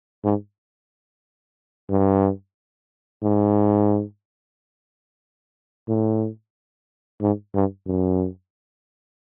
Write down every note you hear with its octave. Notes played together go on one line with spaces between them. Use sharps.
G#2
G2
G#2
A2
G#2
G2
F#2